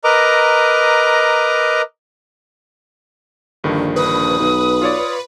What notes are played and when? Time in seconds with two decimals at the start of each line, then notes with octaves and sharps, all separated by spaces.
0.04 A#4 B4 D#5 A#5 D6
3.64 A#1 G2 D3 D#3
3.96 B4 D#6
4.39 B1
4.82 F4 C#5 D5